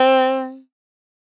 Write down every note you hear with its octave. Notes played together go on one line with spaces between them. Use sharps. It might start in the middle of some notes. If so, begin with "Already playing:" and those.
Already playing: C4